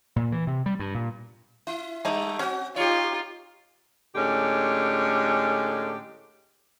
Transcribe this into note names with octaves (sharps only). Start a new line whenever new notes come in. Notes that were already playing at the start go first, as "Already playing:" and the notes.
A#2
E3
C3
G3
G2
A#2
E4
G3 A3 D#4 G#5
C4 C#4 F#4
D#4 F4 G4 C#5
A2 D3 G#3 C#4 G4